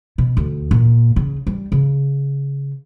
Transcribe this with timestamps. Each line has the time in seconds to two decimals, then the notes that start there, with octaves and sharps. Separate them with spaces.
0.18 B2
0.37 D2
0.71 A#2
1.16 C#3
1.47 G3
1.72 C#3